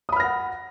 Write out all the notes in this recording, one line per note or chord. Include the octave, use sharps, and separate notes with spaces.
F#5 B5 D#6 F6 A#6